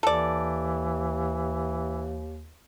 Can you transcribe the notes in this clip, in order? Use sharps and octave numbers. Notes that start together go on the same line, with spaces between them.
D#2 E3 A4 D5